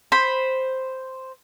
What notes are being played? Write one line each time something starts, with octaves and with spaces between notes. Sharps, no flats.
C5 B5